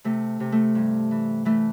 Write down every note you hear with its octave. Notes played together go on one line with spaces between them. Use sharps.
C3 A3
C3
A3
G2
E3
E3 A3